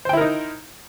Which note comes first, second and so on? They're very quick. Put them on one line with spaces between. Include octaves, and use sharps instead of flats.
C5 G5 E4 A#4 D#4